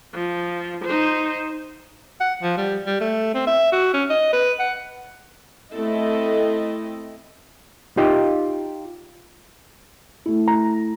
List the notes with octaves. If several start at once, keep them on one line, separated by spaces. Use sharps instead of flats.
F3
D#4 C5
F#5
F3
G3
G3
A3
C4
E5
F#4
C#4
D#5
B4
F#5
A3 C4 E4 A4 D#5
D#4 F4 G4 D#5
A3 E4
A#5